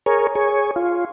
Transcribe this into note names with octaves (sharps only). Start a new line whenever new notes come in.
G#4 A#4 C#5
G#4 C#5
F4